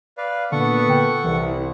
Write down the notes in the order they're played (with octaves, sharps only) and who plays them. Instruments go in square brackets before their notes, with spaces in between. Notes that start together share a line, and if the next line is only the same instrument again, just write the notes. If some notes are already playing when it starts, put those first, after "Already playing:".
[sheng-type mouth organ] B4 D5 F5
[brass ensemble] A#2 B3 [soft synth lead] D3 [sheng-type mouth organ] A4 F#5 C#6
[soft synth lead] G5
[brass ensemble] C2 [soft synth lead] E3